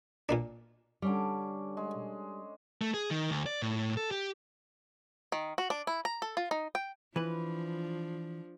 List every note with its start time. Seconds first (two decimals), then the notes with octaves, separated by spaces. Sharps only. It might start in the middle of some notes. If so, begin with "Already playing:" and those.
0.29 A#2 A#3 D4
1.02 D3 G3 C#4 D6
1.77 G#3
2.81 A3
2.94 G#4
3.11 D#3
3.30 D2
3.46 D5
3.62 A2
3.97 A4
4.11 G4
5.32 D#3
5.58 F#4
5.70 D4
5.87 E4
6.05 A#5
6.22 A4
6.37 F4
6.51 D#4
6.75 G5
7.16 E3 F3 D4 B4